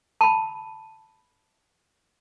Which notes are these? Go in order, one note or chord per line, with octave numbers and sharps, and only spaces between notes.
A5 B5